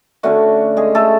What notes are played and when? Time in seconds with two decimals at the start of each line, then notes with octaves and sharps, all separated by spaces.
0.23 D3 A3 C#4 F#4
0.77 G#3 G#4
0.95 A3 A4